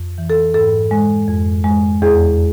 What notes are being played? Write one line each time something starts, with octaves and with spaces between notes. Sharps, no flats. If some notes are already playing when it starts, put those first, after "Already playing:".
Already playing: F2
E3
A4
G#2 A4
G#3
F2
G#3
E2 G#4